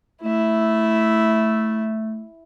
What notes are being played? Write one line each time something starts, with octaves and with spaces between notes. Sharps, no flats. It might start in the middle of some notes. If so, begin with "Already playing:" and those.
A3 E4 E5